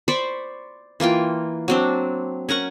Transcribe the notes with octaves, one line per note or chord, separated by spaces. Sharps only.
C5 D5 B5 C#6
E3 A#3 F4 G5
F#3 C4 D4
C#4 A#4 F#5 C#6